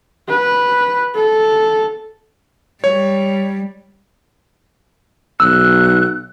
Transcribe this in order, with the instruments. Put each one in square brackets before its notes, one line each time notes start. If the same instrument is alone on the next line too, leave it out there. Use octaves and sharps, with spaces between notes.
[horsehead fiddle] B4
A4
[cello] G3 [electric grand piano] C#5
[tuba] B1 [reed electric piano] E6 [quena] F#6